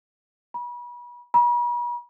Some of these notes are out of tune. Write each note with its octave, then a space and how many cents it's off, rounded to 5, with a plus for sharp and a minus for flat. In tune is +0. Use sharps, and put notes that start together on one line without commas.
B5 -35
B5 -45